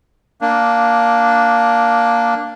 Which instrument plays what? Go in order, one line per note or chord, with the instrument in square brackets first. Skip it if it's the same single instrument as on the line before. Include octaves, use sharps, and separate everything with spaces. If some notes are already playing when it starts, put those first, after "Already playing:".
[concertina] A#3 D4